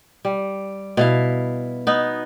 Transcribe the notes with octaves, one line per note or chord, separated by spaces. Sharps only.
G3
B2 E4 F5
B3 D#4